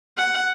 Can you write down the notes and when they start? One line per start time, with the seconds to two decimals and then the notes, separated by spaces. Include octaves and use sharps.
0.17 F#5